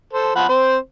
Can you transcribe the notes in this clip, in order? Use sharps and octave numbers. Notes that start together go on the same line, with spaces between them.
A4 C5
F3 F#5 B5
C4 C5